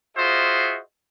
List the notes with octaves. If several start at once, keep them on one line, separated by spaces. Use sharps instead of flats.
F4 F#4 G#4 C5 D#5 E5